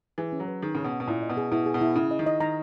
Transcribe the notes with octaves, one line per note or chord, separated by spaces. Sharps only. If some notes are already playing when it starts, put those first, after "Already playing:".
E3 G#4
C#4
F#3
B4
D#3 G#4
C#3 C#4
B2
F#5
B2
A#2 E4
D#5
B2
G#4
B2 E4
G#4
B2
E4
C#3 E4
D#5
D#3
D#5
D#3 A#5